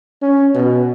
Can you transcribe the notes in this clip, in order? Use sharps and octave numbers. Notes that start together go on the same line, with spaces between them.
C#4
B2